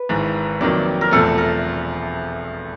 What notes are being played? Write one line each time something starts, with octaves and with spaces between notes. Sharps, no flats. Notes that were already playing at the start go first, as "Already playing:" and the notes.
Already playing: B4
G#1 G#2 E3
F2 C3 D#3 F#3 A#3 D5
A#4
E1 E2 C3 F3 A3 A4
A#4